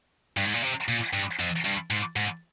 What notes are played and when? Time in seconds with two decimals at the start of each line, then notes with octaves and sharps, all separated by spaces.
0.37 G2
0.45 G#2
0.54 A#2
0.62 C3
0.88 A#2
1.13 G2
1.39 F2
1.65 G2
1.90 G#2
2.16 G#2